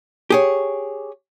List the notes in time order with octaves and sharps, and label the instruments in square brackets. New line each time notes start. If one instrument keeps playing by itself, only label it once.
[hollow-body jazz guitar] G4 G#4 C#5